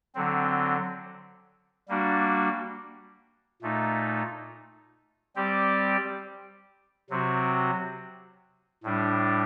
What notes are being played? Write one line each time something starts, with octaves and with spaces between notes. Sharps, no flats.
D3 F#3 C4
G3 A#3 D4 F#4
A#2 A3 D#4
G3 C4 G4 D5
C3 F#3 C4 F#4
A2 G3 D4